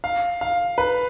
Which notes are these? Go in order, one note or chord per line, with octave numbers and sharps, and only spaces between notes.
F5
F5
B4